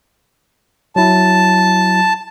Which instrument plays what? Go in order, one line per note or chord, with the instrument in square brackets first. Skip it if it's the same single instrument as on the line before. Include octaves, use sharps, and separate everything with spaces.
[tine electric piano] F#3 E4 [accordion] A5